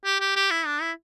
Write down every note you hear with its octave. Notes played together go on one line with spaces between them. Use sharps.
G4
G4
G4
E4
D4
E4